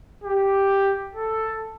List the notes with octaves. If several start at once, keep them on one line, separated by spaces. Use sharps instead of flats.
G4
A4